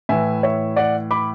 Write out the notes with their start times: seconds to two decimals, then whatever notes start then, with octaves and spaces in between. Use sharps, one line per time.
0.09 A2 E3 E5 G#5
0.43 C#5 E5
0.76 D5 F#5
1.11 B5 D6